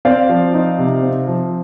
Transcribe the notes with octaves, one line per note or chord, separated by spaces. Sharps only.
C4 D5 F5
F3
D#4
C3
C4
F3